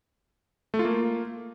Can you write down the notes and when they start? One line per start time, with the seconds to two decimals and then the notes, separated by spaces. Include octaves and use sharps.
0.74 A3
0.79 F4
0.85 A#3